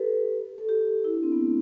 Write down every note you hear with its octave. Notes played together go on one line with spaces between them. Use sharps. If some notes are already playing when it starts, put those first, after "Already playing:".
Already playing: G4 A4 B4
A4
G4
E4
D4
C4
B3
A3